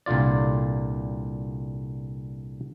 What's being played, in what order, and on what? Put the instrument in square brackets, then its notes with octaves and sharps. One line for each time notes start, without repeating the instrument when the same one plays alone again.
[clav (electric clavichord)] C2 A#2 D3 F4 D5